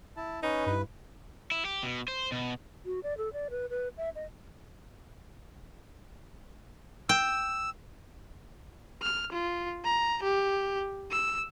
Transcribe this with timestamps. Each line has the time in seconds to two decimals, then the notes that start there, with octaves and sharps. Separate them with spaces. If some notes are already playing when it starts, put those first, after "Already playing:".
0.17 E4 A5
0.43 C#4 D#4 B4
0.66 G2 E4 B4
1.51 E4
1.65 G4
1.83 B2
2.08 C5
2.32 B2
2.86 F#4
3.03 D5
3.18 A4
3.33 D5
3.50 B4
3.70 B4
3.97 E5
4.15 D#5
7.09 G5 E6
9.02 F6
9.33 F4
9.85 A#5
10.23 G4
11.11 E6